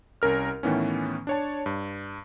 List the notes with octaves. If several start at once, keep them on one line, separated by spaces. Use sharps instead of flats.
C2 C#4 A#4 F6
A2 D#3 E3 B3 C#4
D4 C#5 A5
G2